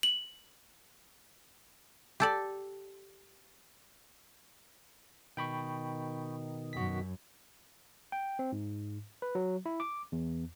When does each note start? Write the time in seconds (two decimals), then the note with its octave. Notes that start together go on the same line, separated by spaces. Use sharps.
0.03 F#7
2.20 G4 A4 D5
5.37 B2 D#3 G5 B5 C#6
6.73 F#2 F#4 B6
8.12 G5
8.39 C4
8.52 G#2
9.22 B4
9.35 F#3
9.66 E4
9.80 D6
10.12 E2